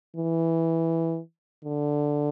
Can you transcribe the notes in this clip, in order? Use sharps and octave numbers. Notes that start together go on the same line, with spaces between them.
E3
D3